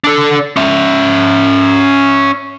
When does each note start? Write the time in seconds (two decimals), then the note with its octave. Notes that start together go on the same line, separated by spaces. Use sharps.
0.04 D4 A4
0.56 C#4 E5